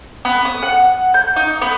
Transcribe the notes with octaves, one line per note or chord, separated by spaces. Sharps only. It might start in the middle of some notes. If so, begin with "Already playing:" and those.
B3
D#6
F#5
G6
D#4
B3